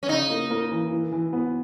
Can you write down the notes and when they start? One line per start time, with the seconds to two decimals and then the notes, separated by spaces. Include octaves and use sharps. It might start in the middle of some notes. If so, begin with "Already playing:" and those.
0.03 C#4
0.09 C#3 D#4
0.30 A#3
0.50 A#3
0.71 E3
0.92 E3
1.12 E3
1.33 B3